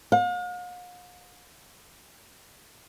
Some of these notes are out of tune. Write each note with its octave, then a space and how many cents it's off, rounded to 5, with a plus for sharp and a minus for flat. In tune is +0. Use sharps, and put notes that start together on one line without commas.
F5 +45